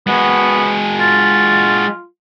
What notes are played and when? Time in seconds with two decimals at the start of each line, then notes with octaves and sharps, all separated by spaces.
0.07 G#3 B3 F#4
1.00 F4 A6